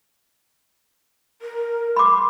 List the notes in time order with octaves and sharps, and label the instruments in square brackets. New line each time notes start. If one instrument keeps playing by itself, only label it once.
[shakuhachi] A#4
[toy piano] B5 D6 [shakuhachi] C6